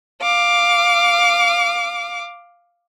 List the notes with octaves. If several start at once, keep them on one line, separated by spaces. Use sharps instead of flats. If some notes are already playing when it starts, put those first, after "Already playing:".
F5 D6